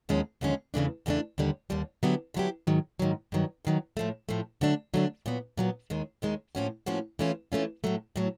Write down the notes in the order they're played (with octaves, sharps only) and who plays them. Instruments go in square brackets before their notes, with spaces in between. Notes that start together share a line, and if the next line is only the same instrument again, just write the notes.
[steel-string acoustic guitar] D#2 D3 F3 G#3 C#4
D#2 D3 F3 G#3 C#4
E2 C#3 E3 A3 D4
E2 C#3 E3 A3 D4
D#2 D3 G3
D#2 D3 G3
D3 F#3 B3 E4 G4
D3 F#3 B3 E4 G4
G#2 D#3 F#3
G#2 D#3 F#3
G2 D#3 F#3
G2 D#3 F#3
A2 F3 A3
A2 F3 A3
D3 F#3 A3 D4
D3 F#3 A3 D4
A#2 F#3 B3
A#2 F#3 B3
D#2 D#3 G#3
D#2 D#3 G#3
A2 F3 A#3 C#4 F#4
A2 F3 A#3 C#4 F#4
E3 A3 C#4 F4
E3 A3 C#4 F4
A2 F#3 A3
A2 F#3 A3